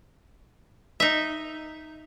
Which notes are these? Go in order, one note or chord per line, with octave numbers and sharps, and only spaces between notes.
D#4 E5